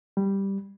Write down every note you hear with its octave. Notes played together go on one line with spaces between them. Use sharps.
G3